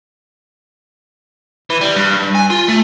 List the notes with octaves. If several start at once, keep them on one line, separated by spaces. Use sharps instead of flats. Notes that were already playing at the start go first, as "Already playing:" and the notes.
E3
G3
G2
G#5
F4
A3